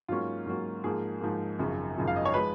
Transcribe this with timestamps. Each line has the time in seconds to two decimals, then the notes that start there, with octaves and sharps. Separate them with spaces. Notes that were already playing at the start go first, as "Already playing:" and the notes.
0.08 G#2 F#3 A#3 C#4 F4
0.46 G#2 F#3 A#3 C#4
0.84 G#2 F3 A#3 G#4
1.21 G#2 F3 A#3
1.59 G#1 F#2 C#3 F3
1.97 G#1 F#2 C#3 F3
2.07 F5
2.16 D#5
2.25 C#5
2.34 F3 G#3 B4